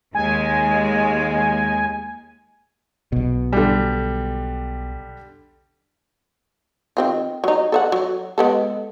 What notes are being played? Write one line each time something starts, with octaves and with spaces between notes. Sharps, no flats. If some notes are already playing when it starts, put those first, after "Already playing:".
D#2 G#3 G#5
B1 B2
D3 G3
D#3 C4 F4
F#3 D#4
A4 E5 F#5
F#3
G#3 B3 A4